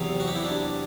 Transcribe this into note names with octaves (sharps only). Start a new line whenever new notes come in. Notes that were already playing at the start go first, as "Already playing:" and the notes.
Already playing: E2 C3 F#3
F#4
G4
E4
D4